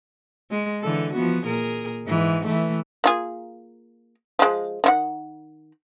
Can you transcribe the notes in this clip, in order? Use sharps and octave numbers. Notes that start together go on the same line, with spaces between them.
G#3
D3 E3 A4
F3 B3 F#4
A#2 G#4 A#4
G#2 E3
E3 A3
A#3 F4 G#4
F3 G#3
D#3 E4 F#5